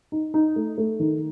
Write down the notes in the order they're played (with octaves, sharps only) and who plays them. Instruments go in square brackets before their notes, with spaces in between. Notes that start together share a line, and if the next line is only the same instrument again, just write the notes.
[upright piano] D#4
D#4
A3
A3
D#3